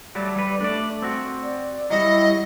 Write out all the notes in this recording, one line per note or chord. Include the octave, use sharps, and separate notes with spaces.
F#3 G3 A3 D5
G3 B4
A3 D4 D5
C4 F#4
D5
F#3 G3 E4 D#5